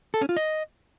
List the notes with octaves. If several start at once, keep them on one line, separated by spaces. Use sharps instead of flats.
A4
C#4
F4
D#5